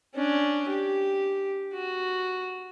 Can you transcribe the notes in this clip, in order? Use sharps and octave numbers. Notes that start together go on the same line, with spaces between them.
C#4 D4
G4
F#4